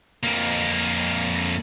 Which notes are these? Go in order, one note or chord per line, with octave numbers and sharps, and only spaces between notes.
F2 A#3